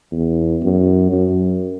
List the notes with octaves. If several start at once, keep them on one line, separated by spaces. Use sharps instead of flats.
E2
F#2
F#2